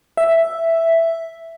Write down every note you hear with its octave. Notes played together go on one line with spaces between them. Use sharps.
E5